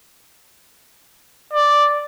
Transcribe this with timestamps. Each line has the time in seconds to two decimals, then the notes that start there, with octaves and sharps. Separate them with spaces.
1.53 D5